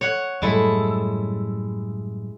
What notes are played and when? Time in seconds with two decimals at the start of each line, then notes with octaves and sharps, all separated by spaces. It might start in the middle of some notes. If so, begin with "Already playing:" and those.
0.01 C#5 F#5
0.42 F#2 A2 G3 G#3 E4 A4